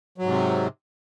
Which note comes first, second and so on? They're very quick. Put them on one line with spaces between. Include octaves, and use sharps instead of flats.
F#3 G#2 C3